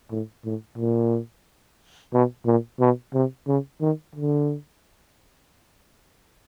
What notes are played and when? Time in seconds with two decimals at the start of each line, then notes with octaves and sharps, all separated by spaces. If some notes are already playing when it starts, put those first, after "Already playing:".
0.11 A2
0.45 A2
0.78 A#2
2.13 B2
2.46 A#2
2.80 B2
3.14 C3
3.47 C#3
3.81 D#3
4.15 D3